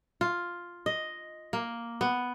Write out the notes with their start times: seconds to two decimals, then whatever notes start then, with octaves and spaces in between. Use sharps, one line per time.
0.21 F4
0.86 D#5
1.53 A#3
2.01 B3